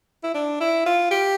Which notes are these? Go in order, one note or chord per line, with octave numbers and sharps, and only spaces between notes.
E4
D4
E4
F4
G4